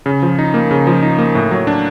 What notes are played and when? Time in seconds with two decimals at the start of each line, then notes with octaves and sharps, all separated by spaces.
0.06 C#3
0.22 F3
0.39 D#4
0.54 A#3
0.71 C#3
0.87 F3
1.03 D#4
1.19 A#3
1.35 A2
1.51 F#3
1.67 D4